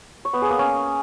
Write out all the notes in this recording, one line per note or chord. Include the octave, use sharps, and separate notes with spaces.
C#5
B3
G#4
A#3
C#4